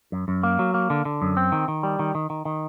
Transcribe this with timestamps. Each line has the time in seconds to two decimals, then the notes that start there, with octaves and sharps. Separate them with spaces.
0.12 F#2
0.28 F#2
0.43 A#3
0.59 F#3
0.74 A#3
0.90 D3
1.05 D3
1.22 F#2
1.37 C4
1.52 D#3
1.68 D#3
1.83 G3
1.99 D#3
2.15 D#3
2.30 D#3
2.45 D#3